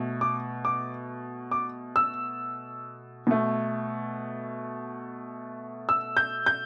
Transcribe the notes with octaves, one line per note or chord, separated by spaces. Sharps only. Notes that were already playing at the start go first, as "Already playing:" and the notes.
Already playing: B2 A3
D6
D6
D6
E6
B2 A3
E6
G6
G6